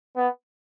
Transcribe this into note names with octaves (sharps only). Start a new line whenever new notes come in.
B3